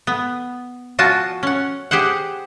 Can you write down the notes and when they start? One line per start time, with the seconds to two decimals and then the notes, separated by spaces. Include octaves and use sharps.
0.07 B3
0.99 F3 F4 F#4 G#5 A5
1.43 C#4 F#5
1.91 G4 G#4 C5 F#5